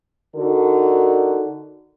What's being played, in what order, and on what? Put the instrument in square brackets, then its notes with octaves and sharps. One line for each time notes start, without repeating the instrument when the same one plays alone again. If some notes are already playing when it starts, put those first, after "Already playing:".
[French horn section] D3 D#4 F#4 A#4